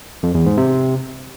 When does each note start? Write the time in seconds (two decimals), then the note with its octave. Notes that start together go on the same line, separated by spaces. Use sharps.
0.23 F2
0.35 E2
0.46 G#2
0.57 C3